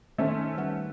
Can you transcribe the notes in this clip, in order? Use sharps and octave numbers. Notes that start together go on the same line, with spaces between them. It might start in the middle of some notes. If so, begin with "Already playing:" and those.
D#3 A3 C#4 D#4 C5 E5
G3 B4 F#5